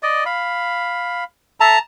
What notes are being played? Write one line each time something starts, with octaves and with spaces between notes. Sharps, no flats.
D5 D#5
F5 B5
A4 E5 A5 A#5